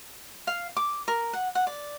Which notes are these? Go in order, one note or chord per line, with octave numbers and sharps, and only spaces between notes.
F5
D6
A#4
F#5
F#5
D5